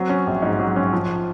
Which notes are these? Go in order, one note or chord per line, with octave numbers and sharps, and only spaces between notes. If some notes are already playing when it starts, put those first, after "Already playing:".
Already playing: F#3 C4
C#4
A#1
G#2
F#3
C#4
F3